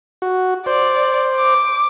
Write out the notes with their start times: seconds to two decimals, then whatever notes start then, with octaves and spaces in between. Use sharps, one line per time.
0.22 F#4
0.66 C5 D5
1.37 D6